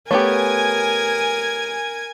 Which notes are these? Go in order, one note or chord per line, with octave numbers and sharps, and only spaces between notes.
A3 B3 G4 A#4 C#5 G#5 G#6